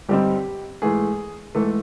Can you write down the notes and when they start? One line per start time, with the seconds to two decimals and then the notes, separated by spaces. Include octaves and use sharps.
0.09 G2 D3 G3 C4 D#4 G4
0.82 G#2 E3 A3 G#4
1.55 G#2 E3 A3 A4